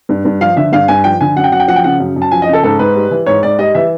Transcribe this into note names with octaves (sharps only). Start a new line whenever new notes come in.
G2
G2
F3 F5
D3 E5
G2 F5
G2 G#5
F3 G5
D3 G#5
F#2 F#5
G5
F#2 F#5
G5
F3 F#5
G5
C#3 F#5
F#2
F#2
A5
F3 G#5
D#5
C#3
A4
G#2 A4
G#2 B4
G3
E3
G#2 C#5
G#2 D5
G3 D#5
E3 E5